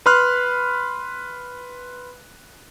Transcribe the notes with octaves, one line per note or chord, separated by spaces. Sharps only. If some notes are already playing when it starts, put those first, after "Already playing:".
B4 B5 C6 F6 F#6